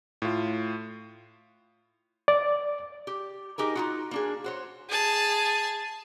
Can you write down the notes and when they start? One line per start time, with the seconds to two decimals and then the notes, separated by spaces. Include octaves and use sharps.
0.22 A2 F4
2.28 D5
3.07 G4
3.58 D#4 G4 G#4 A#4
3.75 D#4 F4 F#4
4.11 A#3 D4 G#4
4.44 F#4 C5 C#5
4.89 G#4 A5